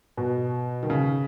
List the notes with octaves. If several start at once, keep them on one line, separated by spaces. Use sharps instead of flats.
B2
D#3
C#3